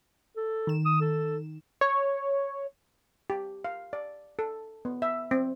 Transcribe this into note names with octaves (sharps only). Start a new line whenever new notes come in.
A4
D#3 E7
D#6
A4
C#5
G4
F5
D5
A4
B3
E5
C4